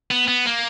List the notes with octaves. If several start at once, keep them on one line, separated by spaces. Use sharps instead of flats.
B3
B3
A#3